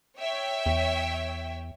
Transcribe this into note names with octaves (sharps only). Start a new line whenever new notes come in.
C#5 E5 G5
E2